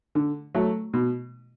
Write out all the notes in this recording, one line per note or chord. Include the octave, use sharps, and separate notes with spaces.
D3
F#3 A3
B2